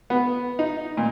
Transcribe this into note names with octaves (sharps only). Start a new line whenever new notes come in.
B3
D#4
A#2